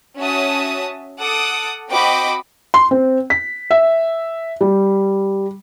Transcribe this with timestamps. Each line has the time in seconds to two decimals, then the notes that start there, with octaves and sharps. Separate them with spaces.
0.17 C#4 F#4 E5 A5 D#6
1.18 A4 F#5 D6 D#6
1.89 C4 F#4 D#5 G5 B5 D6
2.74 C6
2.91 C4
3.30 B6
3.71 E5
4.61 G3